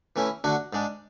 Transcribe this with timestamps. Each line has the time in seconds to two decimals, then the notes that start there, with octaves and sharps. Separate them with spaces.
0.16 E3 A3 C#4 E4
0.44 D3 A3 D4 F#4
0.73 G#2 G#3 D4